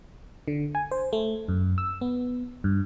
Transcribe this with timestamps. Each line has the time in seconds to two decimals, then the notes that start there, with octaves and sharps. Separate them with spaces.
0.48 D3
0.75 G#5
0.91 C5
1.13 A3
1.48 F#2
1.78 E6
2.01 B3
2.64 G2